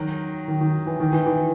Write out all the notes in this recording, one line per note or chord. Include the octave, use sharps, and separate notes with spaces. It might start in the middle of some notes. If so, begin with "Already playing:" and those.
Already playing: D#3 F#3
D#3
D#3
E3
D#3
E3
E3